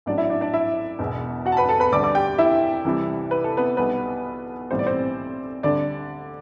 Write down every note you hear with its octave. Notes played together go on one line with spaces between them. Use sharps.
A1 A2 F#3 D4 D5
E4 E5
D4 D5
D4 D5
E4 E5
E1 E2 B2
F#4 F#5
A5
B4 B5
A4 A5
B4 B5
D2 D3 G3 D5 D6
D5 D6
G4 G5
E4 E5
C2 C3 E3 G3
B4
A4
B3 B4
B1 B2 G3 B3 B4
B1 A2 E3 G3 C5
D5
C4 C5
D2 D3 G3 D4 D5